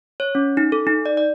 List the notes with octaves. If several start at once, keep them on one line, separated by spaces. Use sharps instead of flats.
C#5
C#4
D#4
A4
D#4
D5
D5